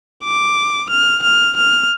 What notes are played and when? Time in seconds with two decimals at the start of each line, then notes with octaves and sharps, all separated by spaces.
0.24 D6
0.90 F6
1.23 F6
1.57 F6